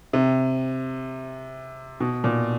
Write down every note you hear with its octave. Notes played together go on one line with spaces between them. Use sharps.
C3
B2
A#2